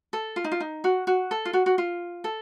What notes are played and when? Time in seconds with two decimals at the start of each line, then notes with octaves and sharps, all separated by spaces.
0.13 A4
0.36 F4
0.44 D#4
0.52 F4
0.60 D#4
0.84 F#4
1.07 F#4
1.31 A4
1.45 F4
1.53 F#4
1.66 F#4
1.78 F4
2.24 A4